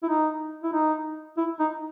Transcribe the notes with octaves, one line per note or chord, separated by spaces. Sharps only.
E4
D#4
E4
D#4
E4
D#4